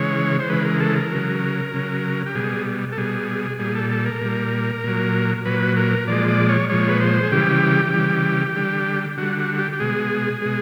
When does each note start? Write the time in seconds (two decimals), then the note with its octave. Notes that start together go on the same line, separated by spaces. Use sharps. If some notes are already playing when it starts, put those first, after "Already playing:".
Already playing: C#3 E3 G#3 C#5
0.39 C5
0.49 C#3 E3 G#3 B4
0.65 A#4
0.80 A4
0.96 A#4
1.11 C#3 F#3
1.74 C#3 F#3
2.26 G4
2.35 B2 G3 G#4
2.92 A4
2.97 B2 G3 G#4
3.59 A#2 G3 G#4
3.75 A4
3.91 A4
4.06 A#4
4.22 A#2 G3
4.84 A#2 F#3
5.45 A#2 F#3 B4
5.76 A#4
6.07 A#2 F3 G#3 D5
6.28 D5
6.49 C#5
6.70 A#2 F3 G#3 C#5
6.89 B4
7.01 C5
7.23 G#4
7.32 C#3 E3 G3 G4
7.94 C#3 E3 G3
8.56 D3 G3
9.18 D3 G3 F#4
9.38 F#4
9.54 F#4
9.59 G4
9.73 G4
9.80 B2 G#3 G#4
10.42 B2 G#3